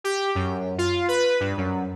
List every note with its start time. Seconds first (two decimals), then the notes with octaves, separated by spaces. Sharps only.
0.04 G4
0.35 F#2
0.78 F4
1.08 B4
1.40 G2
1.57 F#2